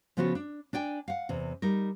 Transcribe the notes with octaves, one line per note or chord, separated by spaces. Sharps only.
C#3 F3 B3 F4 F#4 C#5
D4
D4 D5 G5 G#5
F5 F#5
E2 C3
G3 D#4 A#4